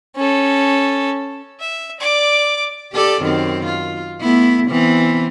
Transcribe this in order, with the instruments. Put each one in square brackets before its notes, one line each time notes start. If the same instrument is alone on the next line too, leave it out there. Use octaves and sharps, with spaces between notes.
[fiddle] C#4 A4
[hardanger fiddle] E5
D5 D6
[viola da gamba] G4 A4 D5
F#2 D#3 C4
F4
A3 B3 E4
E3 B3 C4